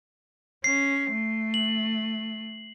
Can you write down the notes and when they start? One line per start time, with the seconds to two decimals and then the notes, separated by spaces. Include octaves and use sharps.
0.64 C#4 C7
1.10 A3
1.54 F#7